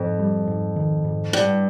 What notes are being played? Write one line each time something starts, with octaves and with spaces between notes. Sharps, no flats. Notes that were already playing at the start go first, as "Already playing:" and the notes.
Already playing: F2 G#2
G3
G#2
D#3
G#2
G2 G3